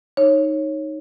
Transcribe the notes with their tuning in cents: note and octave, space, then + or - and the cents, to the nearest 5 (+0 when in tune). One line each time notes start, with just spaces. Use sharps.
D#4 +0 C#5 -15